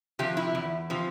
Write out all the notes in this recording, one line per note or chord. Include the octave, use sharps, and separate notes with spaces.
C3 F3 G4
E4
E2
C3 F3